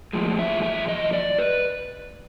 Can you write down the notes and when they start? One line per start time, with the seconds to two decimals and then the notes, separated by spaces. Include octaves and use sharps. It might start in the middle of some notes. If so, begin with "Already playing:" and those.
0.13 A2 F3 G#3
0.39 E5
0.63 E5
0.88 D#5
1.13 D5
1.39 B4